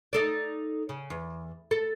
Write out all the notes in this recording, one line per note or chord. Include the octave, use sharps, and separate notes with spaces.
D#4 A4 D5
C#3
E2
A4